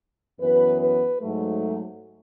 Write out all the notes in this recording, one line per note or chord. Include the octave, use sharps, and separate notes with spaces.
F#2 E3 B3 B4
B4
G#2 F#3 A3